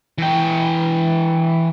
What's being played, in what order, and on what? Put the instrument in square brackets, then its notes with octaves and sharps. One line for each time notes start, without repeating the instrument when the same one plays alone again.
[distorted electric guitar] E3 G5